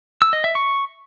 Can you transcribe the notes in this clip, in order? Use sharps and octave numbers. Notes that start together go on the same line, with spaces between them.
E6
D#5
E5
C#6